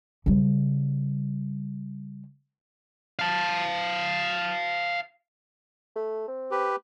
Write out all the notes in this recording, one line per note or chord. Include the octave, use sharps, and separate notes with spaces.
C#3 G3
F5 A5
A3
C4
G4 B4